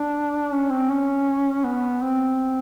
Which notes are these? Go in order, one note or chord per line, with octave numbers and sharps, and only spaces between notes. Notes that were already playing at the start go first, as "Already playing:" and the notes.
Already playing: D4
C#4
C4
C#4
B3
C4